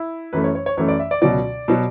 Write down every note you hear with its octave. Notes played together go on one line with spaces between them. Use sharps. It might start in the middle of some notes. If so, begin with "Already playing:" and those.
Already playing: E4
F#2 E3 A3 B4
C#5
C#5
C#5
F#2 E3 A3 C#5
D5
E5
D5
C#2 B2 F#3 D5
B2 F#3